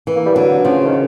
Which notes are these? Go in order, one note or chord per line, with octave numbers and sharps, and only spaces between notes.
E3
A#3
G3
D3 F#3
C#3 F3
D#3